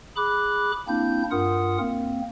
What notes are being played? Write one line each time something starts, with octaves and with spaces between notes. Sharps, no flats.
G#4 B5 D6 F#6
A#3 C4 D4 E4 G6
G2 F4 A#4 F#5 D#6
A#3 C4